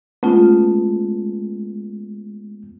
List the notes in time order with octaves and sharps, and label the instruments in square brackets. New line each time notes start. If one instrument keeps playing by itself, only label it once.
[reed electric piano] G#3 B3 [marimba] A3 C#4 F4